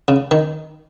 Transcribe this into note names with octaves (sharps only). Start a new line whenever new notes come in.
C#3
D#3